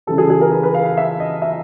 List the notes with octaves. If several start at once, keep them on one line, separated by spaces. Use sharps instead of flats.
C#3 E3 G3 A4
G#4
G#4
A#4
B4
B4
F5
F5
E5
D#5
E5